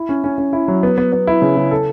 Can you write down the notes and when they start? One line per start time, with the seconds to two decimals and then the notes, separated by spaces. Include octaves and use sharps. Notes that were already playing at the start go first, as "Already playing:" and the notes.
Already playing: E4
0.09 C#4
0.24 C#4
0.38 C#4
0.53 E4
0.68 F#3
0.83 B3
0.98 B3
1.12 B3
1.27 E4
1.42 C#3
1.57 C#3
1.71 A4